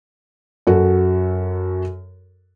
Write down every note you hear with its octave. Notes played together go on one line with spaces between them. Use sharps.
F#2 F#4 A4